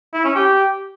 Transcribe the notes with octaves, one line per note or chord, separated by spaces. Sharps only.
E4
C#4
G4